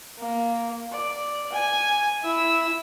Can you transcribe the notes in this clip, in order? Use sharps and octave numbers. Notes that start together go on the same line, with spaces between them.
A#3
D5
G#5
E4 E6